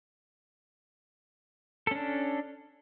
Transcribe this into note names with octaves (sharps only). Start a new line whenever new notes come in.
C#4 D4 A4